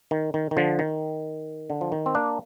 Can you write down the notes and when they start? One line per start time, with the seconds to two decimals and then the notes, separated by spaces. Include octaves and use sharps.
0.11 D#3
0.34 D#3
0.51 D#3
0.57 D3 F3
0.79 D#3
1.70 D3
1.81 F3
1.92 D#3
2.06 C4
2.15 A#3 D4